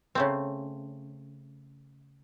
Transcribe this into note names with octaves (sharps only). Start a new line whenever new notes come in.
C#3 A3 C4